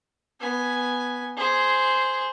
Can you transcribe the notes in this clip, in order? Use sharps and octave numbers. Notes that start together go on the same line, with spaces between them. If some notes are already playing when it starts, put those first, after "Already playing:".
B3 G#5
G#4 C5